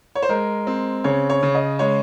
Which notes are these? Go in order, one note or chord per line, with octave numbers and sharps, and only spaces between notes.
C#5
C5
G#3 A#4
C4
C#3 C#5
C#5
C#3
D#5
G#3 C#5